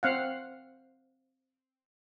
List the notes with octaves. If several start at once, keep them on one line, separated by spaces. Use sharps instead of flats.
C4 F5 F#5